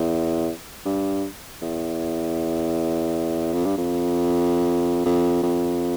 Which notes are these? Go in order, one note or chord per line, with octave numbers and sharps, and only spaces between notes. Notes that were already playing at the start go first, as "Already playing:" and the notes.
Already playing: E2
G2
E2
F2
G2
F2
F2
F2